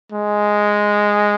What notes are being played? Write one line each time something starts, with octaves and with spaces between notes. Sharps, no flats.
G#3